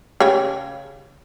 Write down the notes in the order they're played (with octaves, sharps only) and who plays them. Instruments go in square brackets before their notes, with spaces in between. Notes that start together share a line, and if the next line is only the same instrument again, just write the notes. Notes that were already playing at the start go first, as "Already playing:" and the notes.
[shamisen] C#3 G4 C#5